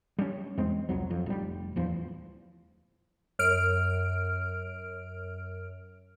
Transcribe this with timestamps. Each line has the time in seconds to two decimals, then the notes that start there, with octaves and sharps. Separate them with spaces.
0.18 G3 C#4
0.58 E2 G#3 C4
0.89 C2 F2 F#3
1.11 F2
1.26 F1 G3
1.76 D1 E2 F3
3.39 F#2 F6 D7